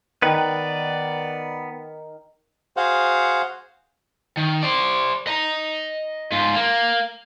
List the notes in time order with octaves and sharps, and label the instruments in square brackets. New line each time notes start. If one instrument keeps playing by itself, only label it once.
[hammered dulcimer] D#3 [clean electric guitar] B3 B4 [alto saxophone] D5
[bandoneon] F#4 G#4 C5 F5 F#5
[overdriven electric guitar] D#3
C5 D5
D#5 A#5
G#2 F4
A#3